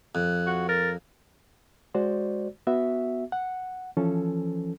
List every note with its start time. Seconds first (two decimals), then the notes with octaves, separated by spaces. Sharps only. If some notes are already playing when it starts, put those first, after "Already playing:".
0.15 F2 F#6
0.47 F#4
0.69 A#4 A6
1.94 G#3 F#4 C5 D5
2.67 B3 F#4 E5
3.32 F#5
3.97 E3 F3 C#4 A4